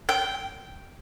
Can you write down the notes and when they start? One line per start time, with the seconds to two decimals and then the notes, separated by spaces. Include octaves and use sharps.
0.09 G5